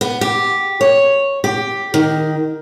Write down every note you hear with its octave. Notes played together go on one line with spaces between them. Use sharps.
B3
G4
C#5
G4
D#3